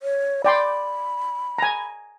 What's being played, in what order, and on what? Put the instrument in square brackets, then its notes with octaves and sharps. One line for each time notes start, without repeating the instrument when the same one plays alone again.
[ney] C#5
[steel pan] D5 G5 C6 [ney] B5
[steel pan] G#5 A#5